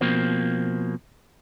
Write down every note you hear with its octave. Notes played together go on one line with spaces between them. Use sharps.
B2 F3 A#3 C4